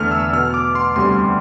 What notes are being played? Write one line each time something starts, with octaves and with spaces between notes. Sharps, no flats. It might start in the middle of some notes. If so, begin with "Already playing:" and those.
Already playing: E2 D3 A3 F6
E6
B2 B3 F6
D6
C6
D2 C3 G3 B3 C6